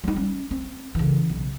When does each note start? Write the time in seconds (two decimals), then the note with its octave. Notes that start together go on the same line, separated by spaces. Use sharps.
0.04 G3 D#4
0.16 C#4
0.51 C4
0.95 C#3 E3
1.29 B1